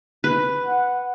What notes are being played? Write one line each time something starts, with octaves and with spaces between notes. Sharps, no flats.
B4
F#5